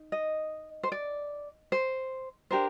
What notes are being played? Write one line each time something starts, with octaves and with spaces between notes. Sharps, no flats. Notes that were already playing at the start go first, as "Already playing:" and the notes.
Already playing: D#4
D#5
C5
D5
C5
D4 G4 A#4 C5